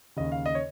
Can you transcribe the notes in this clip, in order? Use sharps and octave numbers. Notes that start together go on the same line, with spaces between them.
D#2 C#3 D#5
F5
D#5
C#5